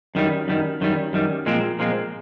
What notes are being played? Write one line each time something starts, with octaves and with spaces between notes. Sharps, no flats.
F#2 D#3 G3
F#2 D#3 G3
F#2 D#3 G3
F#2 D#3 G3
A#2 F3 G#3 C4
A#2 F3 G#3 C4